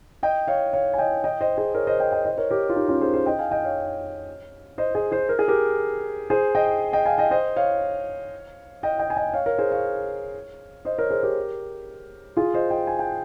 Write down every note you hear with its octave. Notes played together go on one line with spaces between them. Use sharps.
D#5 G5
C#5 F5
C#5 F5
G#5
D#5 G5
D#5 G5
C5 D#5
G#4 C5
A#4 C#5
C5 D#5
D#5 G5
D#5 G5
C5 D#5
A#4 C#5
G4 A#4
F4
D#4 G4
C#4 F4
G#4 C5
G#4 C5
D#5 G5
F5 G#5
D#5 G5
C#5 F5
C5 D#5
G#4 C5
G#4 C5
A#4
G#4
G4 A#4
G#4 C5
D#5 G5
D#5 G5
F5 G#5
D#5 G5
C5 D#5
C#5 F5
D#5 G5
D#5 G5
G#5
D#5 G5
C#5 F5
A#4 C#5
G#4 C5
C#5 F5
C5 D#5
A#4 C#5
G#4 C5
G4 A#4
F4 G#4
C5 D#5
D#5 G5
G#5
G5